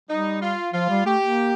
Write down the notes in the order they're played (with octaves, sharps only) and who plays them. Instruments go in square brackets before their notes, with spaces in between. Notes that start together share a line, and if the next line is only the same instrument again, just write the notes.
[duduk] G3 [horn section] D#4
[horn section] F4
[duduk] F3 [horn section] F4
[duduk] G3
[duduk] A3 [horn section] G4
[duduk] A#3